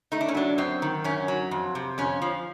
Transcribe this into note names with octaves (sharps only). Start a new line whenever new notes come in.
A3 D#4
D4
C#4
F#3 D4
F#2 C4
D#3
F#2 C#4
F#3
F2
C3
F2 C#4
F3